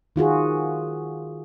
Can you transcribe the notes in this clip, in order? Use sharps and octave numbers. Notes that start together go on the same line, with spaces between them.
D#3 F4 F#4 G#4